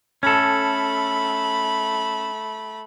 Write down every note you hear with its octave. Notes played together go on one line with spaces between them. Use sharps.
A3 C#4 A4 B5